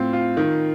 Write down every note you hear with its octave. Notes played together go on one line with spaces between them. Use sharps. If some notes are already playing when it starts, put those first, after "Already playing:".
Already playing: A2 C4 F4
F4
D#3